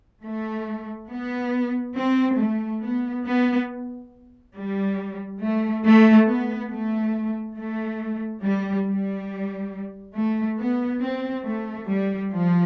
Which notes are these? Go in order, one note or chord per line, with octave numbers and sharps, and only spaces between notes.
A3
B3
C4
A3
B3
B3
G3
A3
A3
B3
A3
A3
G3
G3
A3
B3
C4
A3
G3
F3